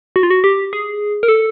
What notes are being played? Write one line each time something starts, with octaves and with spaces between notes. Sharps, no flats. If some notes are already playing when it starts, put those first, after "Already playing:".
F#4
F4
F#4
G4
G#4
A#4
A4